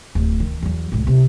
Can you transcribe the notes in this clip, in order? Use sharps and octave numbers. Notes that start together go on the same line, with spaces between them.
D1
D#3
E2 F#3
C#2 A2
C3 C4